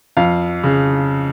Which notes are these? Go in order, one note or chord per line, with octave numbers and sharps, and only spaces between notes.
F2 F5
C#3